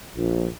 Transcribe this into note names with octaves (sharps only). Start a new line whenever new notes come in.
A#1